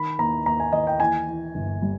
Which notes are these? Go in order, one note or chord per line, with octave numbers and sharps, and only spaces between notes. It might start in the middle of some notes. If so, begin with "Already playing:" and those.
Already playing: D#3 B5
D#2 A#5
D#2 A#5
G#5
D#2 D#5
G5
E3 G#5
E3
G1
G3